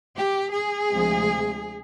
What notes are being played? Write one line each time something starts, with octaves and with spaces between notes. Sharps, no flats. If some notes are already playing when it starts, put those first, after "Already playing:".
G4
G#4
D2 C3 F3 G#3